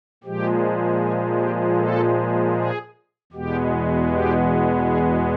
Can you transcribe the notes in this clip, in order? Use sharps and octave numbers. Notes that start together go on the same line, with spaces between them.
A#2 F3 G#3 G4
G#4
G4
A4
G#4
E2 B2 G#3 B3 G4
G4
G#4